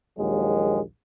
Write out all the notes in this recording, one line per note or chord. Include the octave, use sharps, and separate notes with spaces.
A#1 D#2 F#3 G#3